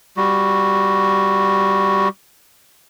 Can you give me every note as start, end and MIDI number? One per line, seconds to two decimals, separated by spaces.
0.17 2.08 55
0.17 2.08 66